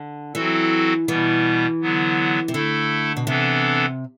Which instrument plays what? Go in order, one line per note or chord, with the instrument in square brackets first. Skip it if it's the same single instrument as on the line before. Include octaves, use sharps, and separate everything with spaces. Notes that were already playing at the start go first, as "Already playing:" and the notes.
Already playing: [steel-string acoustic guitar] D3
[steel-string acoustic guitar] E3 [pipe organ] F#3 C4 F#4 A4
[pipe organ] B2 G3 B3 [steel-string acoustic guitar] E3
[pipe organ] D3 F#3 B3
[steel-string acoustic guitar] C3
[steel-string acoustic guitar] D3 [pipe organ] A3 E4 A4
[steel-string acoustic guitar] B2
[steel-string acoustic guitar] C3 [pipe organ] E3 B3 D4 A4